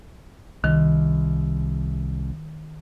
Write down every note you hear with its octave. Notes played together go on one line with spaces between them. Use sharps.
C2 D#3